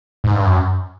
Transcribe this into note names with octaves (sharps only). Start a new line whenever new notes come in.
G#2
G2
F#2